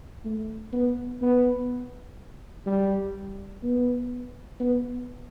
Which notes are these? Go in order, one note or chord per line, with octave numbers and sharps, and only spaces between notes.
A3
B3
B3
G3
B3
B3